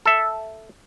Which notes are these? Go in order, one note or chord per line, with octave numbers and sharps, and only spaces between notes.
A4 E5